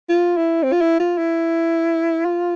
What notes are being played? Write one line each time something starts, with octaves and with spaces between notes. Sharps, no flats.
F4
E4
C4
F4
E4
F4
E4
F4